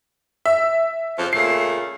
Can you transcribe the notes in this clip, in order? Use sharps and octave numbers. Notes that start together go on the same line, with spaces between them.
E5
F2 C#3 F3
A#2 C#3 A3 C7